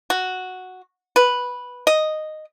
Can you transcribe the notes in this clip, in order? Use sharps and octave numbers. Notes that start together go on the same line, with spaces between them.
F#4
B4
D#5